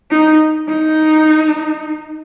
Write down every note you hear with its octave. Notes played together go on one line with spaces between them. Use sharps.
D#4
D#4